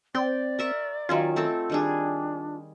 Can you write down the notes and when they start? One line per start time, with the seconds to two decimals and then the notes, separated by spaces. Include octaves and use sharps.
0.15 C4 D5 G5 C6
0.59 A#4 E5 C#6
1.09 D#3 F#3 C#4 F4
1.36 A3 C4 A4
1.70 D#3 G3 D4 G#4